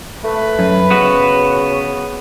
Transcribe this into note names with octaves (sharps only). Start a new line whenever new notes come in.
A3 B4
F#2
C#3 B3 F#4